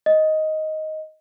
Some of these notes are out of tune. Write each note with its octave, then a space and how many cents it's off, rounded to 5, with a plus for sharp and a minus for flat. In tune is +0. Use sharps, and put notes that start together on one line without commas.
D#5 +5